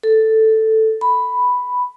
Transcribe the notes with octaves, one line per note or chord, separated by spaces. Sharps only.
A4
B5